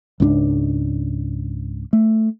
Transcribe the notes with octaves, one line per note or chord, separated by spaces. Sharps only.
C#2 G#2 C4 D4
A3